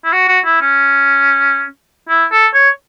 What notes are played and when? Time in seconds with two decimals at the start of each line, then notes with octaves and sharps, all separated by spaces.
0.04 E4
0.13 F#4
0.28 F#4
0.45 E4
0.61 C#4
2.09 E4
2.32 A4
2.54 C#5